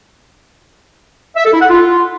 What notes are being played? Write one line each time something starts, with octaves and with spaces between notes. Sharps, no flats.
E5
A4
E4
F#5
F4